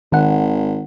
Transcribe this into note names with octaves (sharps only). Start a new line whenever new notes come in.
G#1 D#3 F#5